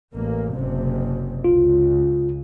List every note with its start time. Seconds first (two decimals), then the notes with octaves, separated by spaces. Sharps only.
0.13 A1 A#3
0.54 F#1 C3
1.44 C#2 F4